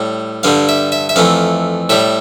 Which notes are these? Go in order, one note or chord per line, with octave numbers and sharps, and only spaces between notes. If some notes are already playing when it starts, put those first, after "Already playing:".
Already playing: A2 G3
G2 D3 G3 F5
E5
E5
E5
F2 E3 A3 F5
A2 G3 E5